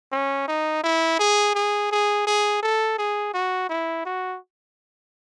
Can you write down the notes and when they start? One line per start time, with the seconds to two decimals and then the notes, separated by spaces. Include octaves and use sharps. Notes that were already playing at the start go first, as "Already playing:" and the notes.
0.12 C#4
0.48 D#4
0.84 E4
1.19 G#4
1.55 G#4
1.92 G#4
2.27 G#4
2.63 A4
2.99 G#4
3.34 F#4
3.69 E4
4.06 F#4